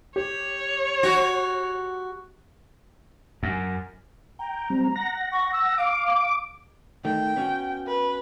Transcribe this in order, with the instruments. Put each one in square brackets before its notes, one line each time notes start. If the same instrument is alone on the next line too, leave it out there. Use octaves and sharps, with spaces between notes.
[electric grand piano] G4 [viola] C#5
[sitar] F#4
[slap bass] F#2
[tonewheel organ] G5 [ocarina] A#5
[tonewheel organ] G3 C4
F#5 A#6
[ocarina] C#6
E6
[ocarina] F5 [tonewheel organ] D6
[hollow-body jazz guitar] D#3 A3 [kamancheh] G5
[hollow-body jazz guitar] B3 C#4 F#4
[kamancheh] B4